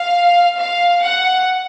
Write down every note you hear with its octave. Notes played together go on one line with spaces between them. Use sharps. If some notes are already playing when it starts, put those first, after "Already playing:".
Already playing: F5
F5
F#5